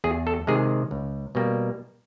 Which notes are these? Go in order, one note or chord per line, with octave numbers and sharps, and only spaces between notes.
E2 G#4
A4
C3 D#3 G#3 G#4
C#2
B2 G3 A#3